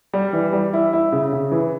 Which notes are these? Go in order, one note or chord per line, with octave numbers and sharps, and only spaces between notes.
G3
E3
G3
E4
E4
C#3
C#3
E3